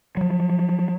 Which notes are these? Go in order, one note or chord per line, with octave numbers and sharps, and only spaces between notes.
F3 F#3